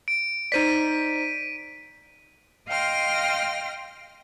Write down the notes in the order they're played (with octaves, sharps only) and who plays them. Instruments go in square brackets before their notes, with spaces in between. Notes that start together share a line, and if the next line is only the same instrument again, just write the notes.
[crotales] D7
[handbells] D#4 C5 D5 [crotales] B6 D#7
[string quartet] D#5 F5 G5 C6 F6 A#6